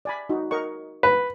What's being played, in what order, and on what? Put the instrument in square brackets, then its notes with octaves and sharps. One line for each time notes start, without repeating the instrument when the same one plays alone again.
[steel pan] D5 G#5 B5
D#4 F#4
A#4 D#5 C#6
[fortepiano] B4